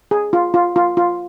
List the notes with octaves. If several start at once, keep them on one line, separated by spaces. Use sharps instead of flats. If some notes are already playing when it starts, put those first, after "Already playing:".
G#4
F4
F4
F4
F4